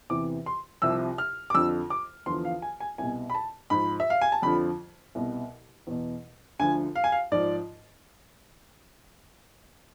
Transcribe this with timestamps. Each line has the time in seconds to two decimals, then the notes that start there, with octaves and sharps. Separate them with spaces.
0.10 E2 C3 E3 D6
0.46 C6
0.82 C2 C3 F3 E6
1.18 F6
1.50 D6
1.55 F2 D3 F3 E6
1.90 D6
2.26 E2 D3 F3 C6
2.45 F5
2.62 G#5
2.80 G#5
2.98 C2 B2 G#5
3.30 B5
3.35 A5
3.70 G#2 F3 B5
4.00 E5
4.10 F5
4.21 G#5
4.32 A5
4.42 F2 D3 F3 B5
5.15 C2 B2
5.87 E2 B2
6.59 D2 D3 F3 G#5
6.95 F5
7.04 G#5
7.12 F5
7.32 G#2 F3 D5